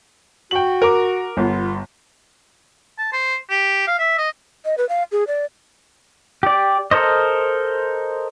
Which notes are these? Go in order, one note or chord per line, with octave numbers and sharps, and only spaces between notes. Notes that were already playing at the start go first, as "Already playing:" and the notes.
F#4 G5 F#7
A#4 D6
G1 B3 F4
A5
C5
G4
F5
E5
D#5
D#5
B4
F5
G#4
D5
G4 D5
A4 A#4 C5 D#5